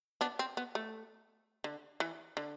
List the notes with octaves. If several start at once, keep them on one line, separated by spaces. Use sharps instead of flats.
B3 D4
C4
B3
A3
D3
E3
D3